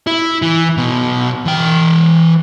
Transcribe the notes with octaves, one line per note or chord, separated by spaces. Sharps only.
E4
E3
B1 B2
E3 G5